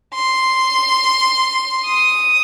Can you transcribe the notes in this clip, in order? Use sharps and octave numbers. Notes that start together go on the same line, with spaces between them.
C6
D#6